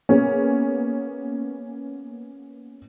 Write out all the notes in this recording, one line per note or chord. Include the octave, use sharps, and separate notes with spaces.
A#3 B3 C#4 G#4